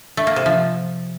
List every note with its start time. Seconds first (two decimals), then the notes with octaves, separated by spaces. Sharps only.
0.17 A3
0.27 A#3
0.36 C3
0.46 F3